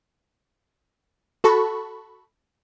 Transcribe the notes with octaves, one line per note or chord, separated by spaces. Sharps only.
F#4 A4 A5 B5 C#6